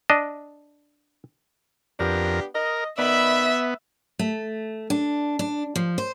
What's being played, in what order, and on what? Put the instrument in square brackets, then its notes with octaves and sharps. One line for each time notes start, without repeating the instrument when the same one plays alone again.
[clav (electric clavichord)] D4 D#5
[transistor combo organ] F2 A#4 [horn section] B3 D4 G4
[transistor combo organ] A#4 [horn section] D#5
[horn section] D#3 D5 B5 [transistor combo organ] B3 [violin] E5
[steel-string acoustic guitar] A3
D4
D4
F3
C5